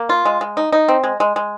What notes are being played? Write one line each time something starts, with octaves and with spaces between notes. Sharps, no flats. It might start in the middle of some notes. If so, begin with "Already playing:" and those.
Already playing: A#3
F4
G#3
G#3
D#4
D#4
C4
G#3
G#3
G#3